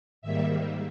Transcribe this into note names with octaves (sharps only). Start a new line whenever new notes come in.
G#2 D#3 G3 A#3 E5